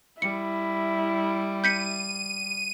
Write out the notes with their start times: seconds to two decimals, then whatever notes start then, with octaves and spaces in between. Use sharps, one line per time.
0.22 G3 E4 C#7
1.64 G6 B6 C#7 D#7